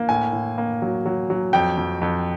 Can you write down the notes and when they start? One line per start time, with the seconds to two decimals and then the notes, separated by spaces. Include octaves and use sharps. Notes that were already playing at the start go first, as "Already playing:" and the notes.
Already playing: A#3
0.09 A2 G#5
0.33 A2
0.58 A#3
0.82 F#3
1.06 F#3
1.30 F#3
1.53 F2 G5
1.77 F2
2.02 F2